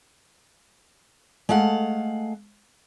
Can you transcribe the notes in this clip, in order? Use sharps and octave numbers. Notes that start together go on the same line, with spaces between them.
G#3 A3 F5 F#5